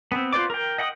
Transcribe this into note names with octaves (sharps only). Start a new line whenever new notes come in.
B3 C4
F4 B4 C5 D5 D6
A#4 G5
D#5 F#5 G5 D#6